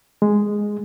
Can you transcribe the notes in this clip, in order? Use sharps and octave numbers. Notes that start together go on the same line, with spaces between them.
G#3